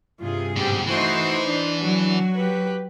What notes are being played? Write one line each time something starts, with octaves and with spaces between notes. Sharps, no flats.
G2 C3 F4 G#4
G#2 B2 C4 G4
E3 A3 D#4 F#4 C5
D4
F#3 F#4
G4 B4